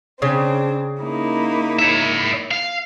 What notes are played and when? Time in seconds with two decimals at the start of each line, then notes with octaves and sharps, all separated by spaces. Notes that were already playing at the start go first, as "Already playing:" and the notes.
0.22 C#3 C4 D4
1.03 A#3 D#4 E4
1.79 C#5 E5
2.51 F5